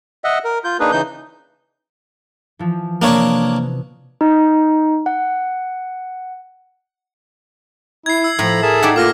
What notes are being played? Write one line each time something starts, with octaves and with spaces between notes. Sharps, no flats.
D#5 E5 F#5
A#4
F4 G6
A#3 D4 D#4 G#4 B4
C#3 E3 D#4 G6
E3 F3
C3 A#3 B3 D4 C#5 D#6
D#4
F#5
E4 G#6 C7
E6
A2 F3 A#5 B5
G#4 A#4 E5 A5
D#4 G4 D5 F#5
A3 A#3 F4 D6 F6 A#6